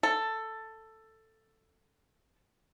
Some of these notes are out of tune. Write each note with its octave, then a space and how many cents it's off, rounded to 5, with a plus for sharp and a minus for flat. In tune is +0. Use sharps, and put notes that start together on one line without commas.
A4 +10